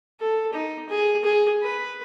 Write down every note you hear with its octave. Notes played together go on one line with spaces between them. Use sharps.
A4
D#4
G#4
G#4
B4